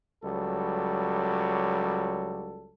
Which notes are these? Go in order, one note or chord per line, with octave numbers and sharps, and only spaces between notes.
C#2 F#3 G3 A4